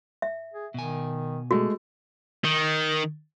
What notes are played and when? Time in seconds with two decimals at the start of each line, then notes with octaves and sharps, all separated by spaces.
0.22 E5
0.54 G#4
0.74 B2 D#3 G#5
1.51 G#3 A3 F#4
2.44 D#3